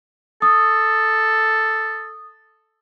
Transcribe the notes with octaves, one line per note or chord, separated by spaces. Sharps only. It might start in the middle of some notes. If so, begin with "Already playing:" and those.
A4 D#6